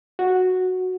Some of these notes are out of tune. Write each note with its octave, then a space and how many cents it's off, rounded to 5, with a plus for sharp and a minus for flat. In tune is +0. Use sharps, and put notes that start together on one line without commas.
F#4 -5